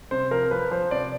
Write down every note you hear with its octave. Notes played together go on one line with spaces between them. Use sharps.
C3 C5
F3 A#4
F3 B4
F3 C5
C3 D5